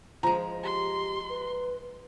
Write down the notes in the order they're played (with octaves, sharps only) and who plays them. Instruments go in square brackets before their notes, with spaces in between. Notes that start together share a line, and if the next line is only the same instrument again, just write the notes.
[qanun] F3 G#3 [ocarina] C5 [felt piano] A#5
[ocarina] G4 [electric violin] C6
[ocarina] B4